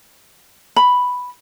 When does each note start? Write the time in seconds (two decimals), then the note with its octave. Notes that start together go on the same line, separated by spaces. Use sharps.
0.76 B5